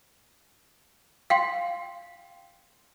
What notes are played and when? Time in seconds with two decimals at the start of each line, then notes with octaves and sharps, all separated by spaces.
1.30 F5 G5 C6